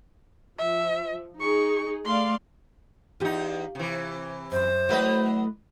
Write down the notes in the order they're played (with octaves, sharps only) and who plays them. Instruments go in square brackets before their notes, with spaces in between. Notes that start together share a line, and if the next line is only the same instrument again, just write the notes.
[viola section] F3 [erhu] E5
[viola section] D#4 G#4 [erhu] C#6
[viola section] A3 D5 F5 [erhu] C6
[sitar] E2 D#4 [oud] F4 G4
[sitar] C3 E3
[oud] F#2 [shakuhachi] C5
[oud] E3 A3 [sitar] F#3 B4 D#5